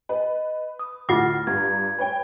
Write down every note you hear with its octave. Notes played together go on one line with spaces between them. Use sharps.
B4 D#5
D#6
D2 A2 F4 F#5 D6 F6 A6 A#6
G2 A#5 G#6
B4 C#5 G5